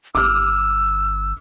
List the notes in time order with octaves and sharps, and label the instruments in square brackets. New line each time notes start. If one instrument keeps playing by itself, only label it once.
[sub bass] G1 [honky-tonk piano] D6 F6 [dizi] E6